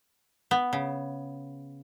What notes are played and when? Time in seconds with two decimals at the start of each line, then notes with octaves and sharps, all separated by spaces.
0.51 B3
0.73 C#3